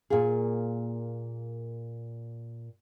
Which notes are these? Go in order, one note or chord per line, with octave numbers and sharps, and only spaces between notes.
A#2 A#3 F4 G#4